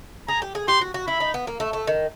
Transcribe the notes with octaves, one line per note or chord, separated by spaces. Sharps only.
G#4 A#5
G4
G#4
G4 C6
F#4
F#4
E4 B5
D#4
B3
A#3
A3
A3
D#3